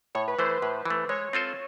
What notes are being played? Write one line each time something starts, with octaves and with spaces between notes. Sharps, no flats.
A2 C#5
B4
E3 A3 C5
A2 B4
E3 A3
G#3 C#5
C4 F4 A4 C5